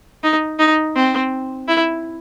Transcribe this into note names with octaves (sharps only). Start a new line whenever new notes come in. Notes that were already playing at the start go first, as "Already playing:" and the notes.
D#4
D#4
C4
E4